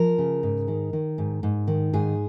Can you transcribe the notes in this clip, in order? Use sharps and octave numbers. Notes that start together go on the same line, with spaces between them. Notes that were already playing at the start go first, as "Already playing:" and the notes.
Already playing: F3 A#4
C#3
G#2
D#3
D#3
G#2
G#2
D#3
G#2 G#4